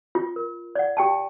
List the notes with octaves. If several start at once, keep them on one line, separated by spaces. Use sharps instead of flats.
F4
A#4
D5 F#5
G4 G5 A5